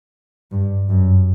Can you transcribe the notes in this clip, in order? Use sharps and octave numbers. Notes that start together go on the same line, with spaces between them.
G2
F#2